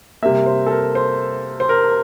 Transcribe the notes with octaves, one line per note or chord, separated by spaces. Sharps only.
C3 G3 A#3 E5
C5
A4
A#4
C5
C5
A#4